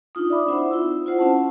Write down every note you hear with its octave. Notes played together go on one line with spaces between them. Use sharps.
D4 D#4 F4 D#6
D5 E5 B5 D6
C4 E4 C5 E5 F#5
D#4 F4 E6
E4 F4 C5 F#5
C4 C#4 F#5 A5